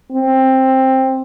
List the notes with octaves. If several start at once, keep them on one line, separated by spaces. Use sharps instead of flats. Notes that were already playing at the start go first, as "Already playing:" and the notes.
C4